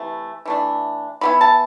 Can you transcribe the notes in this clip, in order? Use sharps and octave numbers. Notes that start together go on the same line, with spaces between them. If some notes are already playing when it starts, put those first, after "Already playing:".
Already playing: C3 E3 A3
E3 A3 D4
E3 B3 E4 B5
A5